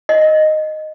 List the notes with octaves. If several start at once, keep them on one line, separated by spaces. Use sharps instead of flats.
D#5